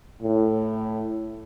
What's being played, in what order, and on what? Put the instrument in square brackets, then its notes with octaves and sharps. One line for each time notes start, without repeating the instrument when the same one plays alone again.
[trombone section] A2